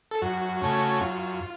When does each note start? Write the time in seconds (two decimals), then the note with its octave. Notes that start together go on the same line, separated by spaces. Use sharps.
0.11 A4
0.22 F#2 F#4
0.61 C#3 A3 C#4
1.00 F#2 F4